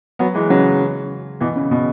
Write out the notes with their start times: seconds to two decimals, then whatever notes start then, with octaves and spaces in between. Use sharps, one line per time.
0.19 F#3 B3
0.34 E3 G#3
0.50 C#3 F#3
1.40 B2 E3
1.56 C#3
1.71 B2